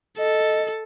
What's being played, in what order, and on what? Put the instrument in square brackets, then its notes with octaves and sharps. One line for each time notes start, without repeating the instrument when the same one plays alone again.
[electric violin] A4 [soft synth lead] D#5